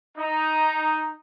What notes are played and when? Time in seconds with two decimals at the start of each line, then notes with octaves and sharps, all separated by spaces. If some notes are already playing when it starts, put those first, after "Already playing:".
0.17 D#4